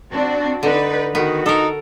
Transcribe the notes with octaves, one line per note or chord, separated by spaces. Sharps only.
C4 D4 F#4
D3 D#4 B4 D5
D#3 B3 F#4
D#4 A4 A#4